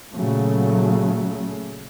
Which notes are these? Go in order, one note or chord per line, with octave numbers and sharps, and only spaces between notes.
A#2 C#3 F#3 A3